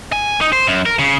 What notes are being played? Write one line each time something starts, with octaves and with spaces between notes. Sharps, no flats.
G#5
D#4
C5
F#2
A#4
C#3